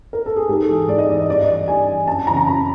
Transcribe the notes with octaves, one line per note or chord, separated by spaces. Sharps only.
A#4
A4
G#4
G#2 G4
A4
E3 G#4
G#2 D5
D#5
E3 D5
D#5
G2 D5
D#5
E3 D5
G2 G#5
E3
F#2 A5
C#3 E3 A#5
A#5
F#2 B5